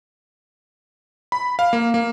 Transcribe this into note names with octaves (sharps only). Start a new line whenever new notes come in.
B5
F5
A#3
A#3